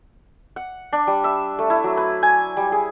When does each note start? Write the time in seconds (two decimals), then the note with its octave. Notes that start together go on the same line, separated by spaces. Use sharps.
0.56 F#5
0.93 D4
1.07 G3
1.24 E5
1.59 A3
1.70 E4
1.84 F#3
1.97 B4
2.23 G#5
2.57 G3
2.72 G#4